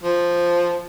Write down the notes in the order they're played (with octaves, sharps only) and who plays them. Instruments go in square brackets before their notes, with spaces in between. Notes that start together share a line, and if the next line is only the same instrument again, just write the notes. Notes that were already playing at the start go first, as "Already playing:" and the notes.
[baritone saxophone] F3